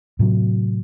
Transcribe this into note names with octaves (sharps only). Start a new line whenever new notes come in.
A2 C3 F#3